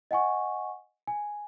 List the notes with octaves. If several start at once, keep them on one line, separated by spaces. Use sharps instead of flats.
D#5 F#5 G#5 C#6
G#5